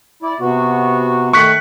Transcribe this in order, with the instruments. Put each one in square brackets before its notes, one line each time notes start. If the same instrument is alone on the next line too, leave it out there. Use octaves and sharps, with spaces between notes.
[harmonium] E4 D5
C3 B3 F#4
[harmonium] D#3 A3 [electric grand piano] C#6 F#6 B6